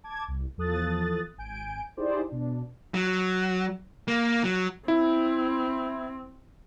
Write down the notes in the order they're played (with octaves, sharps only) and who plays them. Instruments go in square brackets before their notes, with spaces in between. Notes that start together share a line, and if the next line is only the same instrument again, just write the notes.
[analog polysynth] A5 D6 G#6
C2
E2 F3 A4 D#6 F#6 A6
G#1 G#5 G6 D7
D#4 E4 G4 G#4 C5 D5
B2 D4
[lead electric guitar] F#3
A#3
F#3
[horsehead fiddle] C4 [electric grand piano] E4